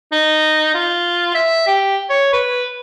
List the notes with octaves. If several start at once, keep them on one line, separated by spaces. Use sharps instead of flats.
D#4
F4
E5
G4
C#5
B4